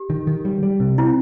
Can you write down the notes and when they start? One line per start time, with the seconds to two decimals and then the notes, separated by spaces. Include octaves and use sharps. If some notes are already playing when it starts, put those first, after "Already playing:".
Already playing: G4
0.10 D#3
0.27 D#3
0.45 G3
0.63 G3
0.80 C3
0.98 C4 E4